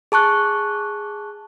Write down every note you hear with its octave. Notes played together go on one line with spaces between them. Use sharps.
G#4 A5 C#6 F#6